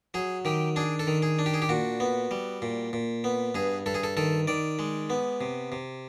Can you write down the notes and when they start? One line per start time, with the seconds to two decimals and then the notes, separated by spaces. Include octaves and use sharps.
0.14 F#3 G#4
0.45 D#3 G4
0.76 D4 G#4
0.99 A4
1.07 D#3
1.22 G#4
1.39 D4
1.46 G4
1.54 G#4
1.62 G4
1.69 A#2 F#4
2.00 B3
2.31 G3
2.62 A#2
2.93 A#2
3.24 B3
3.55 G2 G#4
3.86 G2 A4
3.95 G#4
4.04 A4
4.17 D#3 A4
4.47 D#3 D5
4.79 G#3
5.10 B3
5.41 C3
5.72 C3